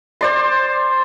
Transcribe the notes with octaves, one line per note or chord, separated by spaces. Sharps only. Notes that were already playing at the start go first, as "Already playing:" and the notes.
C5 D5 C6